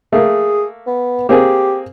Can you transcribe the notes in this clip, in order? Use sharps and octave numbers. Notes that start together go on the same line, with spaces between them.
A3 A#3 G#4
B3
A#3 C4 G4 G#4